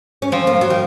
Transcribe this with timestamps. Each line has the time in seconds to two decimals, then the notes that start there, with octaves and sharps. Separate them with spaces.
0.22 C#4
0.32 F3 C4
0.47 A#3
0.61 F#3
0.70 D#3